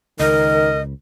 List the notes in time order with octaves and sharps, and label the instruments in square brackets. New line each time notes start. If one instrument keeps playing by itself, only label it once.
[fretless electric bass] C#2 [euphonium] D#3 [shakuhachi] A#4 [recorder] D#5